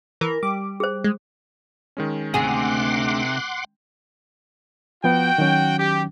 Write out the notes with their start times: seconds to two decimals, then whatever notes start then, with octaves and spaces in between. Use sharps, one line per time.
0.21 E3 A#4
0.43 G3 D6
0.80 G#4 C5
1.04 G#3
1.97 D#3 G#3 C#4
2.34 D2 C3 G#4 F#5 C6 D6
5.04 F3 B3 F#4 G5
5.38 D#3 F#3 C#4
5.78 G4